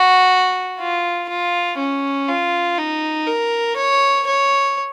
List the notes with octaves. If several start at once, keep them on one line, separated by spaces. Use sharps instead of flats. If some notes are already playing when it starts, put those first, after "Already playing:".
Already playing: F#4
F4
F4
C#4
F4
D#4
A#4
C#5
C#5